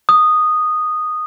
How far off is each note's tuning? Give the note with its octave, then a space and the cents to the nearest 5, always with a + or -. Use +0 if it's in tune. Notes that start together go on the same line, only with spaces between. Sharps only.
D#6 -10